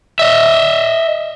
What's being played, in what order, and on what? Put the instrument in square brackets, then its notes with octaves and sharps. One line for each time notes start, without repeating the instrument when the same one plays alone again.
[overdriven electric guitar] D#5 E5